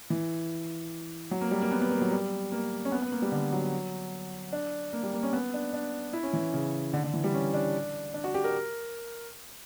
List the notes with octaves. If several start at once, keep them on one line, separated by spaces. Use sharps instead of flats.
E3
F#3
A#3
G3
A#3
B3
B3
A#3
F#3
G3
A#3
C#4
B3
B3
A#3
G3
D3
F#3
D4
A#3
G3
A#3
C#4
B3
D4
D4
E4
C#4
E3
C#3
D3
D3
E3
G3
C#4
D4
D4
F#4
G4
A#4